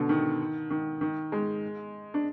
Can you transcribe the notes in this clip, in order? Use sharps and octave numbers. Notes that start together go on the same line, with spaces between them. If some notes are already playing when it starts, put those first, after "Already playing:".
Already playing: B2 D3
D#3
D#3
D#3
G#3
D4